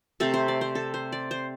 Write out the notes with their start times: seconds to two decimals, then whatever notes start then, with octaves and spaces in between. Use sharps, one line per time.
0.20 C3 A3 C4 A4
0.34 C5
0.48 D5
0.61 C5
0.75 A4
0.94 C5
1.12 D5
1.31 C5